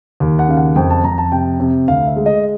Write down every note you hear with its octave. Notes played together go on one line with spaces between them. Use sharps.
D#2
F#5
C#3 F5
F#5
F2 G5
A5
F2 A#5
A5
C3 G5
C3
D2 F5
E5
G#3
D#5